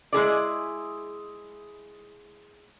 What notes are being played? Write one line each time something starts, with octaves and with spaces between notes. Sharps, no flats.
G#3 E4 G#4 D5